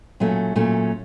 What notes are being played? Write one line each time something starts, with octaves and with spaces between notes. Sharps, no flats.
A#2 F#3 A3 C#4
A#2 F#3 A3 C#4